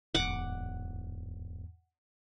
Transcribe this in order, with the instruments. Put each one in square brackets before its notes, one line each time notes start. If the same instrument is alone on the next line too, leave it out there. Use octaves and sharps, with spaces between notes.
[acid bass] D1 [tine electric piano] E2 G#2 [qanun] F#5 D6